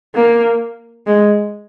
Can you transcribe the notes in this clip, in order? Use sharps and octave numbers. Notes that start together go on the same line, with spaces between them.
A#3
G#3